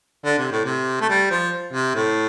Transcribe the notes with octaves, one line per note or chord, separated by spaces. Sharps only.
D3
C3
A2
C3
A3
G3
F3
C3
A2